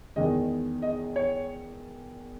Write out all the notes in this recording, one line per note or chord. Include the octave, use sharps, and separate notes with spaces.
E2 D#3 G#3 D#5
D#5
C#5